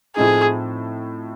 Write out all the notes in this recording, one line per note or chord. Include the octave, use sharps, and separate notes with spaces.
A2 F3 A3 C4 D#4 G#4